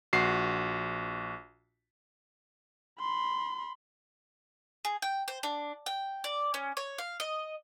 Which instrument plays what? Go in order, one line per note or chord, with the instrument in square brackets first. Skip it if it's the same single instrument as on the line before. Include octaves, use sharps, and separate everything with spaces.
[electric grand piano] A#1 F#4 C7
[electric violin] B5 C6
[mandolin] G#4
G5
C5
D4
G5
D5
C#4
C#5
F5
D#5